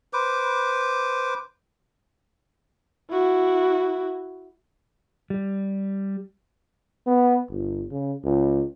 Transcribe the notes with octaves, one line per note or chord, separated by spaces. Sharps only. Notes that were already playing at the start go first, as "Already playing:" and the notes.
B4 C5 D6
E4 F#4
G3
B3
G1
C#3
C#2